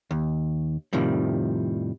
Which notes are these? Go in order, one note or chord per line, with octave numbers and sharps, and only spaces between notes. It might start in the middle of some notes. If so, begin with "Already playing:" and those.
D#2
F2 A2 C3 D#3 F3 G3